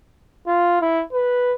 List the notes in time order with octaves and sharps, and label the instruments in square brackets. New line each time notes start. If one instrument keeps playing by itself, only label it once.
[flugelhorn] F4
E4
B4